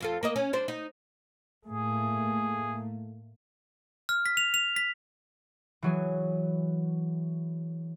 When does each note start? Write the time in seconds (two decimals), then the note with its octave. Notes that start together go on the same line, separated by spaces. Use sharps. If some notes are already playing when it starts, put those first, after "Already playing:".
0.01 F2 F4 A4
0.23 A#3 A#4 D#5
0.36 C#4
0.53 G3 D4 C5
0.68 D#4
1.65 A2 A3 A#3 G#4
4.09 F6
4.26 B6
4.37 F7
4.54 F7
4.76 B6
5.82 E3 F#3 G#4